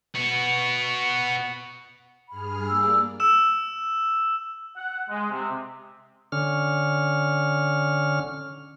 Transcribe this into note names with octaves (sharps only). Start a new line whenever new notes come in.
B3 F#4
G2 G#4 B5 F6
A#3 D5 E6
E6 E7
F#5
G#3
C3
D3 C#4 F6